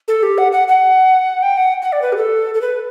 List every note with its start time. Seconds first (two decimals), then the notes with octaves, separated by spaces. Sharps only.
0.08 A4
0.23 G4
0.38 F#5
0.52 F#5
0.68 F#5
1.43 G5
1.57 F#5
1.82 F#5
1.92 D5
2.02 B4
2.12 G4
2.17 A4
2.54 A4
2.62 B4